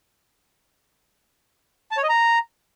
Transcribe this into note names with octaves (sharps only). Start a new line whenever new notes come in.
A5
C#5
D#5
A#5